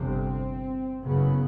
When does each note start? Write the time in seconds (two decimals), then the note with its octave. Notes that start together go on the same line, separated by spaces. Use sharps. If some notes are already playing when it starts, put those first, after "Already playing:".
Already playing: G1 F2 C3 C4
1.03 F#1 F#2 C#3 B3